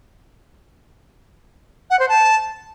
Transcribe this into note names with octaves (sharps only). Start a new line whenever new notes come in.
F#5
C5
A5